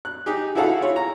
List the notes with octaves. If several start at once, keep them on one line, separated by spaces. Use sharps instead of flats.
F#6
D#4 G4 G#4
E4 F#4 G#4 A4 F5 F#5
E4 F4 C#5
A#5